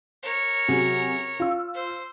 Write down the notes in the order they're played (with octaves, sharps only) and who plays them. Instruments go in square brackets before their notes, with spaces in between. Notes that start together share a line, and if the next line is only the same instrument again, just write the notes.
[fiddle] A#4 C#5
[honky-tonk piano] C3 F#3 G#4
F4 E6
[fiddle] C5